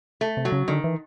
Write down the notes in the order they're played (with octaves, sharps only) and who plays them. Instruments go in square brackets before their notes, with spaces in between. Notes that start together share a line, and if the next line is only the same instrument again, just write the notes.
[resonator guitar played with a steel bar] A3
[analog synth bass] C3
[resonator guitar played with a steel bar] F#3
[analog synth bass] C#3
[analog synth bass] D3 [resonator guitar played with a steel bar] D#3
[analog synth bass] E3